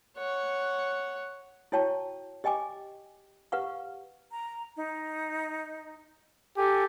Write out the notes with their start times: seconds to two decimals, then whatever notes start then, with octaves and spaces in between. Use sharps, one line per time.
0.17 C#5 F#5
1.72 E4 F#4 C#5 G5 A5 C#6
2.44 G4 D#5 G5 G#5 D6
3.52 G4 B4 F5 F#5 C#6
4.32 A#5
4.77 D#4
6.57 G4 A4 G#5